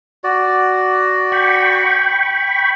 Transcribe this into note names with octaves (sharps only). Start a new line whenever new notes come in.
F#4 D5
G5 B5 C#6